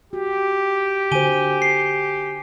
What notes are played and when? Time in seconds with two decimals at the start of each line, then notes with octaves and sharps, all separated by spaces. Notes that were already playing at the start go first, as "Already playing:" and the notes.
0.13 F#4 G4
1.12 D3 F#4 C5 G#5 D#7 G7
1.62 C7